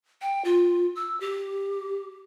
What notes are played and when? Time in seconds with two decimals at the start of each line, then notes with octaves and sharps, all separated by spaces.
0.21 G5
0.45 F4
0.95 E6
1.21 G4